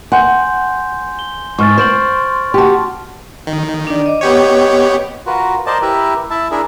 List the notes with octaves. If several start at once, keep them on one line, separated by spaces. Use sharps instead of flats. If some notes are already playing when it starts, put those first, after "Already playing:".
F#5 G#5 C6 G6
G7
G#2 C#6 F6 A6
C5 A6 D7 F#7
F#4 G4 A5 C6
D#3
D4 D5
D#5 D6
B3 G4 C#5
F4 F#4 A#4 B4
A#4 C5 D5 D#5 A5
E4 G4 A#4 B4 E5
E4 E5 A5
D4 E4 G#4 A#4 E5